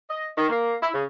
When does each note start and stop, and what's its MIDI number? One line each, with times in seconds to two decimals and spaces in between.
0.10 0.27 75
0.38 0.49 51
0.50 0.76 58
0.83 0.90 64
0.94 1.05 49